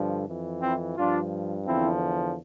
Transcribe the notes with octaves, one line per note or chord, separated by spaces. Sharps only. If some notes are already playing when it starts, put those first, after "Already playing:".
Already playing: G2 D3 F3
F2 E3
C4 E4
G2 F3 D4 F4
E2 D3 F3 C4 E4